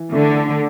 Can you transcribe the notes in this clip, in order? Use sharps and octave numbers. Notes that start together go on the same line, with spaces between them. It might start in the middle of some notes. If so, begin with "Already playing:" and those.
Already playing: E3
D3 A3
A4